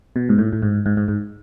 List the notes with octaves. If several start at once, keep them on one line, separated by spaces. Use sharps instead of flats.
B2
G#2
A2
A2
G#2
G#2
G#2
G#2